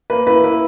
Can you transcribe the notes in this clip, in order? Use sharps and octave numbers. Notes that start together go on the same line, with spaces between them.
A#3 B4
E4 B4
E4 B4